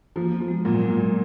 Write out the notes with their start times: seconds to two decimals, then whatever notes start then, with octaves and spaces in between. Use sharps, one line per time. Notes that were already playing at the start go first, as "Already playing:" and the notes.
0.16 F3 A#3
0.33 B3
0.40 F3
0.48 G#3
0.65 A#2 F#3
0.82 G#3
0.90 A#2
0.97 F#3